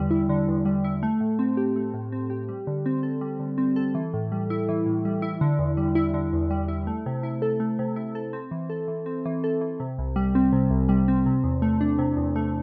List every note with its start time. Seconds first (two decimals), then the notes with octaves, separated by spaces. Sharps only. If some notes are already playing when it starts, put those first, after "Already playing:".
Already playing: E2 D3 G3
0.11 E4
0.29 D3
0.48 E2
0.65 G3
0.84 E4
1.03 A3
1.20 A2
1.39 C4
1.57 G4
1.76 A3
1.94 A2
2.12 C4
2.30 G4
2.49 G3
2.67 D3
2.86 C4
3.03 A4
3.21 G3
3.39 D3
3.58 C4
3.76 A4
3.95 E3
4.13 A2
4.32 G3
4.50 E4
4.69 E3
4.86 A2
5.05 G3
5.22 E4
5.41 D3
5.59 E2
5.77 G3
5.95 E4
6.14 D3
6.33 E2
6.51 G3
6.68 E4
6.87 A3
7.06 C3
7.23 E4
7.42 A4
7.60 A3
7.79 C3
7.96 E4
8.15 A4
8.33 C4
8.51 E3
8.70 A4
8.88 E3
9.06 C4
9.25 E3
9.44 A4
9.61 E3
9.80 C3
9.98 C2
10.16 G3
10.35 C4
10.52 C3
10.70 C2
10.89 G3
11.08 C4
11.26 C3
11.44 E2
11.62 A3
11.81 D4
11.99 C3
12.17 E2
12.36 A3